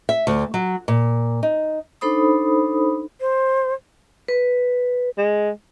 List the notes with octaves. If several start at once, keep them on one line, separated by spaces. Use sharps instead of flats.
E5
D2
F#3
A#2
D#4
D4 D#4 A4 C5 B5 D#6
C5
B4
G#3